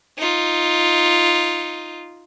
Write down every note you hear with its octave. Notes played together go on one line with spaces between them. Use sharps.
D#4 F4